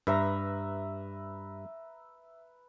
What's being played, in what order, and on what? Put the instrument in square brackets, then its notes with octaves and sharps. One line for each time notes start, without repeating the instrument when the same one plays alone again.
[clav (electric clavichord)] G2 [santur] B4 E5 A#5